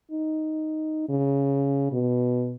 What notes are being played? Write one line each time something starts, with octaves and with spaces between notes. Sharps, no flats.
D#4
C#3
B2